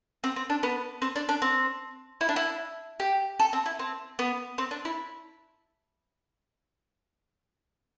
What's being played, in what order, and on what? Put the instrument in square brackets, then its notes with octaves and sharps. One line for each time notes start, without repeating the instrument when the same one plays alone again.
[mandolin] C4
C4
D4
B3
C4
D4
D4
C4
E4
D4
E4
G4
A4
C4
E4
C4
B3
C4
D4
E4